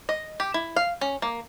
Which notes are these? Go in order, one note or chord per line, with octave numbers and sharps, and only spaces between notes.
D#5
G4
E4
F5
C#4
A#3